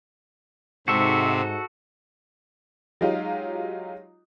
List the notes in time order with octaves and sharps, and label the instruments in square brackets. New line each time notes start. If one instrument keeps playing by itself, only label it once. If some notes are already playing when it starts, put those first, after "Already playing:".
[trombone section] G#2 [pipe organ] C3 C4 [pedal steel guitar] F#4 A4 E5
[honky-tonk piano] F#3 G#3 D#4 F4 G4